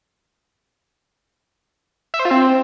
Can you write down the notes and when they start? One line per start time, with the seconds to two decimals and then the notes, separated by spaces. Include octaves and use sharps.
2.14 E5
2.19 C5
2.25 F4
2.31 C4